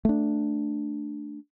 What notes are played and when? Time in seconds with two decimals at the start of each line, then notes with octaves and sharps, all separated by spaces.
0.05 A3 D4